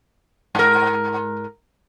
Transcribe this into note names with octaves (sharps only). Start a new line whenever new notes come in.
G#2 A#4